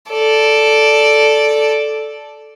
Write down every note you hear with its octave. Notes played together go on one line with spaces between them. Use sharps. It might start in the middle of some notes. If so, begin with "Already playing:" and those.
A4 D5